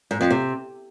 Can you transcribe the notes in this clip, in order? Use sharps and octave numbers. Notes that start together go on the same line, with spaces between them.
G#2
F2
C3